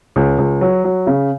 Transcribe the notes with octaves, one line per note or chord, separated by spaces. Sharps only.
C#2
C#2
F#3
F#3
C#3